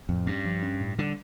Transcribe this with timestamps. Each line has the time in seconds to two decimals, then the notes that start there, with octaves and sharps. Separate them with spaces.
0.09 F2 A2
0.27 G2 C#4
0.45 F3
0.63 C#4
0.81 A2
0.98 D3 G3